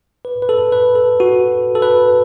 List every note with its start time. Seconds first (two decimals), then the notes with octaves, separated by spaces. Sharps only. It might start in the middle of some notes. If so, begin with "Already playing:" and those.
0.25 B4
0.42 B4
0.49 A4
0.72 B4
0.95 A4
1.20 F#4
1.75 A4
1.82 B4